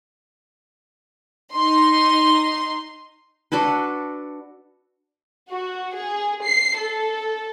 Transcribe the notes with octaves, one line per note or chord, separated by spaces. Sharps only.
D#4 C6
D4 F#4 A4 B4
F#4
G#4
C7
A4